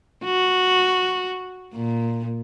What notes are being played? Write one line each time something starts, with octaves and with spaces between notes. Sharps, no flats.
F#4
A#2